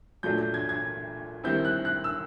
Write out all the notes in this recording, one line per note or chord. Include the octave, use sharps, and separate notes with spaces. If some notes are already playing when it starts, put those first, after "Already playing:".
A#2 F#3 A3 D4 G6
G6
G#6
G#6
D#3 G3 C4 E4 G6
F#6
F#6
E6